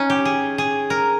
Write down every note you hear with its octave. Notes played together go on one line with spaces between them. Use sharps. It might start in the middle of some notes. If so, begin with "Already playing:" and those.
Already playing: C#4 D#4
G4
G#4
G#4
A#4